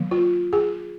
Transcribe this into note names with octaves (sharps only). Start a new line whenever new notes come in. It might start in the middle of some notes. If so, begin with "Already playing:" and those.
Already playing: D#3 F#3 A#3
F4
G#4